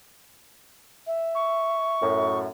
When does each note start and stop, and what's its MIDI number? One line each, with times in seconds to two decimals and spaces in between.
1.07 2.30 76
1.35 2.38 85
2.01 2.48 42
2.01 2.48 45